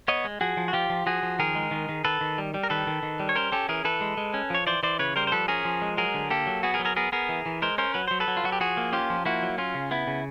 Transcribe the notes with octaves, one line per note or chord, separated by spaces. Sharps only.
B3 C#5 D#5
G#3
F3 F#4 G#4
F3
F#4
F3 F4 G4
F3
F3 F#4 G#4
F3
D#3 G#4 A#4
G#3
D#3
D#3
D#3 A4 B4
D#3
G3
G3
A#4
D#3 A4 B4
D#3
D#3
G3
C#5
C#4 A#4 C5
C#4 G4 A4
E3 G#4 A#4
E3 A4 B4
G#3
G#3
C#4
F3 C#5
E3 C5 D5
E3 C5 D5
C#3 B4 C#5
G3 A#4 C5
C5
F3 A4 B4
C#4 G#4 A#4
F3
G#3
F#3 G#4 A#4
D3
A#3 G4 A4
F#3
B3 F#4 G#4
G#4 A#4
F#3
G#4 A#4
B3 G#4 A#4
B3 G#4 A#4
E3
E3
G#3 A#4 C5
C#4 A#4 C5
F#3 B4
F#3 C5
A4 B4
F#3
F4
F#3 F#4
G4
F3 F#4 G#4
A#3
C#4 F4 G4
F3
A#3 E4 F#4
F#3
C#4 F4
C#3
B3 E4
C#3